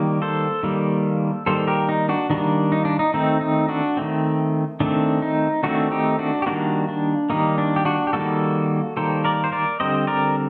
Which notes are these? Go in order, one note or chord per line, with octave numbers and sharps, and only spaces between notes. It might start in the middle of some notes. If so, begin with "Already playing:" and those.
Already playing: D#3 G3 A#3
A4 C5
D#3 G3 A#3
D#3 G3 A#3 A4 C5
G4 A#4
D#4
D4 F#4
D#3 G3 A#3 D4
D#4
D4
D#4
D#3 A3 C4 D#4
D#4
D4 F#4
D#3 A3 C4
D#3 A3 C4 D4
D#4
D#3 A3 C4 D4 F#4
D#4 G4
D4 F#4
G4
D#3 G3 A#3 D4 F#4
D4
D#3 G3 A#3 D#4
D4
G4
D4 F#4
G4
D#3 G3 A#3 F#4 A4
D#3 G3 A#3 A4 C5
A#4 D5
C5
A#4 D5
D3 G3 C4 C5 D#5
A#4 D5